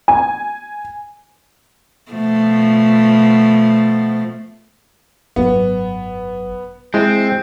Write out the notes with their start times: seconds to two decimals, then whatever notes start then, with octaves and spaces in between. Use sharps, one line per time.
0.08 G#5
2.12 B2 F3 A3
5.36 G#1 F#2 F#3 B3
6.94 G#3 C4 E4